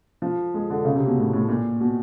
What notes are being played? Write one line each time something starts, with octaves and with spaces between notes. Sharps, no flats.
F3
G#3
D3
C#3
C3
B2
A2
A2
A#2
B2